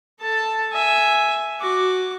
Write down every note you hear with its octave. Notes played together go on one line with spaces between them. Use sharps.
A4 A5
E5 G#5
F#4 D6